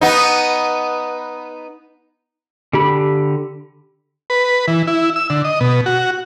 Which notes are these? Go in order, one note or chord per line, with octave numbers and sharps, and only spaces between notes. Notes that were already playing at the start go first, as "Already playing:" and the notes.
B3 D#4
D3 G4 B5
B4
E3
E4
E6
D3
D#5
B2
F#4